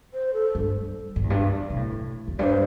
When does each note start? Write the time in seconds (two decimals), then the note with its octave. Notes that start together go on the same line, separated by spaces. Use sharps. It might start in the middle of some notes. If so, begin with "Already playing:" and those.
0.14 C5
0.33 A4
0.55 G2
1.16 G2
1.24 E2
1.30 G2
1.70 C3
1.76 A2
2.28 E2
2.39 G2 C5 D5